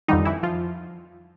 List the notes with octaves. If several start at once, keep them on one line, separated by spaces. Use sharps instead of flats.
F2 D3 D#3 G3 D#4
E3 E4
F3 F4